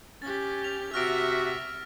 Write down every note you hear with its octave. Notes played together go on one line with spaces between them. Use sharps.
C#4 G4 A6
F7
C3 F#4 E5 F6 A#6 D7